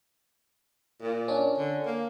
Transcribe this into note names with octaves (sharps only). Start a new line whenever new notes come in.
A#2
C#4 D4
D3
A#3